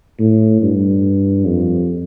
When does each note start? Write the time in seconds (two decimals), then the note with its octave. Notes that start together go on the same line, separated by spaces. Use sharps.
0.20 A2
0.62 G2
1.46 F2